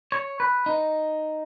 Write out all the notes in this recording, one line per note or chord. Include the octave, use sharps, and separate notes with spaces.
C#5
B4
D#4